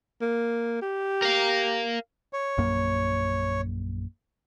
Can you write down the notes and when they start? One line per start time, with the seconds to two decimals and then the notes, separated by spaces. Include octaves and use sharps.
0.21 A#3
0.82 G4
1.22 A#4 F5
2.33 C#5
2.58 A#1 F#2 A#3